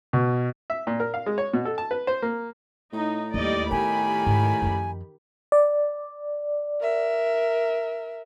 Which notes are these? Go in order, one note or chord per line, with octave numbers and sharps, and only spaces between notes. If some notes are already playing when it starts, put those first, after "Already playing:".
B2
E5
A#2
A#4
F5
G#3
C#5
B2
A4
A5
B4
C5
A#3
A2 D#4
D#2 G3 D5 D#5
D#3 B3 G4 G#5 B5
G#2
F#2 F3
D5
A#4 E5